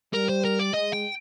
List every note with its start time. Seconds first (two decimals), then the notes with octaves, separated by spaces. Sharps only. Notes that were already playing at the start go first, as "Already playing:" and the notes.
0.14 G3 A#4
0.29 C5
0.44 A#4
0.59 D5
0.74 G#3 D#5
0.93 G5